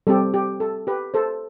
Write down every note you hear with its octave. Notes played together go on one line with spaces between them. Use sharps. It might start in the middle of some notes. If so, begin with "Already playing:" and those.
G3 C4 G4 A4
G4
A4
G4 B4
A4 C5